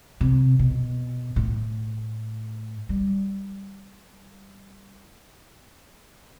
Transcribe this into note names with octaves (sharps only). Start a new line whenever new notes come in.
C3
B2
A2
G3